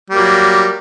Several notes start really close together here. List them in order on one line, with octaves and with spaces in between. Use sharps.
G3 A#3 F#3